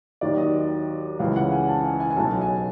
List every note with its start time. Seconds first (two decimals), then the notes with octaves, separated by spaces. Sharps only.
0.21 D#2 D#3 F#3 D5
0.38 D#5
1.19 C#2 C#3 E3 F5
1.36 F#5
1.52 G#5
1.68 A5
1.84 G#5
2.00 G#5
2.10 G#5
2.17 B1 B2 F#3 A5
2.41 G#5